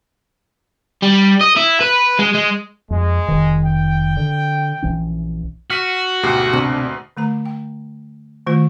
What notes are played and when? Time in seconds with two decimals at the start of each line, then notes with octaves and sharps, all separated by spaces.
1.03 G3
1.41 D#5
1.56 E4
1.81 B4
2.19 G#3
2.35 G#3
2.90 F2 G#3
3.28 F1 D#3
3.65 G5
4.17 D3
4.82 A#1 E3 C#4
5.70 F#4 F6 B6 D#7
6.23 D2 G#2 B2 G4
6.53 C3 D4
7.17 D3 A3 A#5
7.46 G5
8.47 D#3 A3 F4 C5